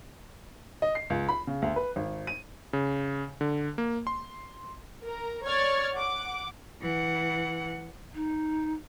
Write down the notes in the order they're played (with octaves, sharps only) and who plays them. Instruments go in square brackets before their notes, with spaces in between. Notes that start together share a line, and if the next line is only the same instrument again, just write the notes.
[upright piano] D#5
C7
C#2
B5
C#3
D2
B4
G#1
D#7
[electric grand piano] C#3
D3
A#3
C6
[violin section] A#4 A#5
C#5 D5 C#6 F6 G#6 A6
F#5 D6
[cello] E3 F#5
[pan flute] D#4